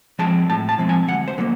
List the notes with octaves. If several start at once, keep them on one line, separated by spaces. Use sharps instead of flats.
F3 G#3 C4 A5
A2 A5
A5
F3 G#3 C4
G#5
D2 F#5
C5
D3 F#3 A#3